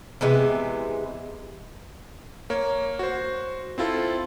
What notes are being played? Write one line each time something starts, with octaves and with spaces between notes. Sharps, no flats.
C3 E3 G#3 B3
A#3 C#5
F#4 C5
C4 E4 F4 A4